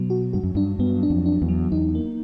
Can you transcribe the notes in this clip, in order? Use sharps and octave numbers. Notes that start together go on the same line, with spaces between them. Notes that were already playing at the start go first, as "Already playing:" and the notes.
Already playing: B2 F#3
F#4
G2 F#4
F#2
G2 D4
G2 B3
D4
F2
D4
E2
F#3
E2 D#4
A#3